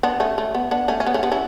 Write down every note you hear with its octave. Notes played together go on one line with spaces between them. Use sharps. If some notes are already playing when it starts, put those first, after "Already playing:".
B3 D4
A3 C#4
A3
B3
B3 D4
A3 C#4
C#4
B3
A3 C#4
B3 D4
C#4 E4